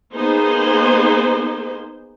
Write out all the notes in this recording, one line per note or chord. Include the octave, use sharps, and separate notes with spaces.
A#3 B3 D#4 G#4 C5